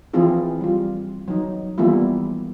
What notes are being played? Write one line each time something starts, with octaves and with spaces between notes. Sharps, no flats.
E3 F3 C4 E4 F4 G#4
G3 F4
F#3 D#4
E3 G3 A#3 B3 E4 F4